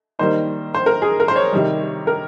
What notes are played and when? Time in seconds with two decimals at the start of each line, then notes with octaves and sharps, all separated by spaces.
0.19 D#3 G3 A#3 D#4 C5
0.74 C5
0.86 A#4
1.02 G#4
1.20 A#4
1.28 C5
1.36 C#5
1.53 C3 D#3 G3
2.07 A#4